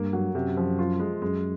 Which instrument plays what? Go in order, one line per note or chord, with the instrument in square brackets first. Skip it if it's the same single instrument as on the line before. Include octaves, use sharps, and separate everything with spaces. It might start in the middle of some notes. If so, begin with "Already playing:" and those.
Already playing: [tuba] G2 [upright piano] A#3
[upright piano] F#3
[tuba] F#2 [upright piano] C3
[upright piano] F3
F4
G#3
[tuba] F#2 [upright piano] G#3